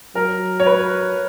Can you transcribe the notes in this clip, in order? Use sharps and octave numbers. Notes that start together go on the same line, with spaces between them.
F#3 A#4
C#5
B4